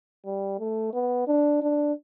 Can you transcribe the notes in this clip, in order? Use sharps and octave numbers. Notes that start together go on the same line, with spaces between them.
G3
A3
B3
D4
D4